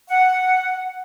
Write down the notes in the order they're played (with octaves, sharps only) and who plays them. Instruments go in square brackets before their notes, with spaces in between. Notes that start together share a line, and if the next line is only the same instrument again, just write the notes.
[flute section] F#5